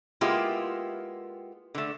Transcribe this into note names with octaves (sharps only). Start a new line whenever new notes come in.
G#3 A#3 B3 E4 F4 G4
D3 A3